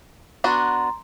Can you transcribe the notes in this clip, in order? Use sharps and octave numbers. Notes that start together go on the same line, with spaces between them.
B3 D4 F#4 A#5 C6